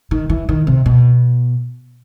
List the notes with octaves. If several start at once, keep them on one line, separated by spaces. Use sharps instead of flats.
D#3
E3
D#3
C3
B2